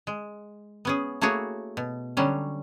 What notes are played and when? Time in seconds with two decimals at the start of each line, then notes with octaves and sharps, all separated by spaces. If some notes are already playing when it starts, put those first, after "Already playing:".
0.07 G#3
0.85 B3 C#4 G#4
1.21 A3 A#3 E4 F#4 G#4 C#5
1.77 B2
2.17 D3 F#3 G3 C#4